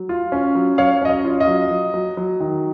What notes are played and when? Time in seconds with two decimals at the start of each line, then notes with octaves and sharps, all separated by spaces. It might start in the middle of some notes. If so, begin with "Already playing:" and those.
Already playing: F#3
0.09 F4
0.32 C#4
0.55 F#3
0.78 F#3 C#5 F5
1.02 C#4 D#5
1.10 C#5
1.25 F4
1.40 D#5
1.47 F#3
1.71 F#3
1.94 F#3
2.17 F#3
2.40 D#3